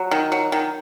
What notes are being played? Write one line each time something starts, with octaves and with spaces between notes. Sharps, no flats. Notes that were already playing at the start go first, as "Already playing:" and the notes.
Already playing: F#3
D#3
F#3
D#3